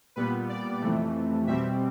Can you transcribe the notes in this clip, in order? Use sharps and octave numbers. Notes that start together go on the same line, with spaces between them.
A#2 G3 B3 B4
D5
F2 C3 E3 A3
B2 G3 C4 E5